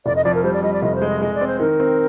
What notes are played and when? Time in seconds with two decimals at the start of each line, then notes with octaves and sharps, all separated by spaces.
0.06 F1 D5
0.16 D#5
0.24 F2 D5
0.34 A#4
0.44 G3 C5
0.53 D5
0.63 G3 D#5
0.73 D5
0.82 F1 D#5
0.95 C5
1.02 G#3
1.08 D#5
1.21 G#3 D#5
1.35 D5
1.41 C4
1.47 C5
1.60 D#3 A#4
1.80 C4